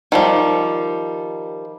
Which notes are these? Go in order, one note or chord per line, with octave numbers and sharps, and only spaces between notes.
D#3 F3 G3